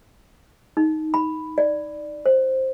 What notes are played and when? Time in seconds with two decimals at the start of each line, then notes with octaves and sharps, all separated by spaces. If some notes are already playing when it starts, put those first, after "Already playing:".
0.77 D#4
1.14 B5
1.58 D5
2.26 C5